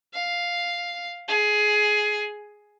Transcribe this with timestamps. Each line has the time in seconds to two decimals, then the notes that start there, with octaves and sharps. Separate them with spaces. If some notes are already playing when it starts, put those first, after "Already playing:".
0.13 F5
1.28 G#4